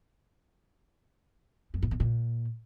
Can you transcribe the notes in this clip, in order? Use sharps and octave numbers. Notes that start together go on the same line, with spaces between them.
F#2
G#2
B2
A#2